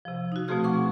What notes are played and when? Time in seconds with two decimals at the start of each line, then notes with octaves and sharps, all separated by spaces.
0.05 C3 F3
0.32 D#4 F#4
0.48 B2 F3 A3 C4 G#4 F6
0.64 F#5 C#6 D6